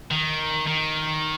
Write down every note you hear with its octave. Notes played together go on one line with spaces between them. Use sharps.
D#3
D#3